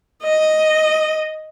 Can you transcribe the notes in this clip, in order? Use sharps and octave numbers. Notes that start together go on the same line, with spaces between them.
D#5